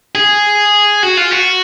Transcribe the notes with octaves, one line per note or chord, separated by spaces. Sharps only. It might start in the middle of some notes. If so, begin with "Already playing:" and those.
G#4
F#4
F4
F#4